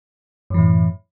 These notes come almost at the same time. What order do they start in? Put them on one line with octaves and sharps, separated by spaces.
F#2 E3 A2